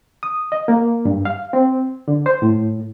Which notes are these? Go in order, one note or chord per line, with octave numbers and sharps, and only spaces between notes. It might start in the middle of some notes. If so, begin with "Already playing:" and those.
D#6
D#5
A#3
G2
F5
C4
D3
C5
A2